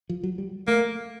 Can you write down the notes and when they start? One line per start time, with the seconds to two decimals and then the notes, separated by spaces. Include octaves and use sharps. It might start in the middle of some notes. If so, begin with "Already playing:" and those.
0.09 F3
0.23 F#3
0.38 G3
0.67 A3 A#3